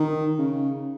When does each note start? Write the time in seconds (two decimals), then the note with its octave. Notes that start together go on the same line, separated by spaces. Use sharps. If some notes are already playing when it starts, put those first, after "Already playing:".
Already playing: D#3
0.38 C#3